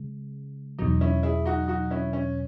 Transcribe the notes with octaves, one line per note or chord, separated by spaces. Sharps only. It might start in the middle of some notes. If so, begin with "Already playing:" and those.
Already playing: C#3 G#3
E2 B2 F#3 D#4
C#4 E4
E4 G#4
D#4 F#4
D#4 F#4
C#4 E4
C#4